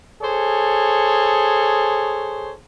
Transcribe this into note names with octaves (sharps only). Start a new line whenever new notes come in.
G#4 A4 C5 C#5